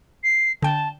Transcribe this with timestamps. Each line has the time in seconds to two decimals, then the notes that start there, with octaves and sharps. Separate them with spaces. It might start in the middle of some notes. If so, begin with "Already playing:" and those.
0.23 C7
0.62 D3 G5 A5